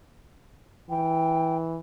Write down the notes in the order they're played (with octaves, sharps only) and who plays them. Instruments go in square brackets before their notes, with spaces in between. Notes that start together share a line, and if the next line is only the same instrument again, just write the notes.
[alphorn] E3 [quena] G5